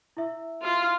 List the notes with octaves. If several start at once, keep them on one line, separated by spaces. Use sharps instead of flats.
E4 E5
F4